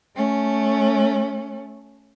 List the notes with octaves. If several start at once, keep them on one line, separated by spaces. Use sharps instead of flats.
A3 C#4